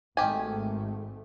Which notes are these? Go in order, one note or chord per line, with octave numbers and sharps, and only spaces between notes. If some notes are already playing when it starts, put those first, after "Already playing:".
G#1 G#2 D#3 A3 G4 G#5